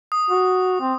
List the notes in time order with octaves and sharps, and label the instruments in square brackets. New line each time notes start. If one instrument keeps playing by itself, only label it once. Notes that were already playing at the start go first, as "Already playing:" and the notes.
[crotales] D#6
[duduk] F#4
C4